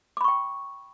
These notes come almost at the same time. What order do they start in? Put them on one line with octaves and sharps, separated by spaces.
D6 B5 C#6 G5